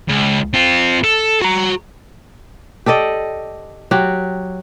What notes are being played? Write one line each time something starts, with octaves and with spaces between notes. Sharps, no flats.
C#2
C4 F4
A4
F#4 A#5
G4 A4 D5 D#5
F#3 F#4 G4